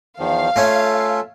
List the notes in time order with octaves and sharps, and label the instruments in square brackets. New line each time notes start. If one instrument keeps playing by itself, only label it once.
[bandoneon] E2 D#3 F3 [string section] F5
[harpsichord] A3 C#4 [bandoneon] F4 A4 E5